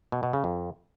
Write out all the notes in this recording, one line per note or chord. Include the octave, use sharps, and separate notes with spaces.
B2
B2
C#3
F2